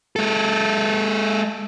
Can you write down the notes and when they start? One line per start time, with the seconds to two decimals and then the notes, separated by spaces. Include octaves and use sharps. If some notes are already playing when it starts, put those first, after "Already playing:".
0.16 G#3 A4